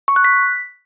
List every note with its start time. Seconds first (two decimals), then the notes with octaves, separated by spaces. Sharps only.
0.08 C#6
0.16 F#6
0.24 B6